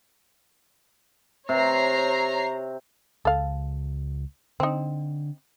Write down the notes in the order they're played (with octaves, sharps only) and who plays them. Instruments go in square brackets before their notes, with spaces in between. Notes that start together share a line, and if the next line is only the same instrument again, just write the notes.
[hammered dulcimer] C3 [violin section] C#5 A#5 C7
[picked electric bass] C#2 [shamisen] A4 F5
[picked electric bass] D3 [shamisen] C4 D#4